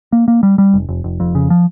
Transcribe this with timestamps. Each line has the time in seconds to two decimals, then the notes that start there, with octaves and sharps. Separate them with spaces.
0.12 A#3
0.28 A#3
0.43 G3
0.58 G3
0.74 F1
0.89 F1
1.04 F1
1.20 F2
1.35 C#3
1.50 F3